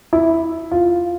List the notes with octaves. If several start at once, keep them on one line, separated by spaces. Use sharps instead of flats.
E4
F4